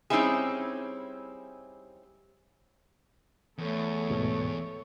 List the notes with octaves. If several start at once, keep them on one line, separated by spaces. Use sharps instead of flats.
G3 C4 C#4 D#4 E4 G#4
E2 A3 A4 C#5
D2 G#2 B2